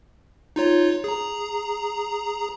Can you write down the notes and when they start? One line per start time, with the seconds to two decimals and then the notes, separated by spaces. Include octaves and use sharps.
0.56 D#4 F4 C#5
1.04 G#4 A#5